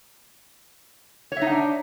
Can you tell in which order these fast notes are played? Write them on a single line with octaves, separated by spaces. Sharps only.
C#5 E5 D#4 F#5 D4